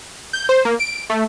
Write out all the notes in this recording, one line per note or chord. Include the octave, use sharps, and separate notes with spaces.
G6
C5
A#3
D7
A3